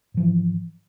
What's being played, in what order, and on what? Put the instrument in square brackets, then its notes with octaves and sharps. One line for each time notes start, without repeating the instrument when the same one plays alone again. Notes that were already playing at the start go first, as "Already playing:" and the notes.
[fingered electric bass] G#2
F3
E3